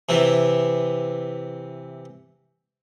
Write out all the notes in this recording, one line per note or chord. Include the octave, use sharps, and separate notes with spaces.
C3 E3